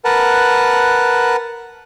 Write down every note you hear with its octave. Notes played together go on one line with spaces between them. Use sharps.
A#4 B4 F#5 A5